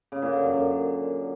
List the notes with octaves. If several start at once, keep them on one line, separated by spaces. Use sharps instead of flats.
C#3
A#2
D3
F#2
F#2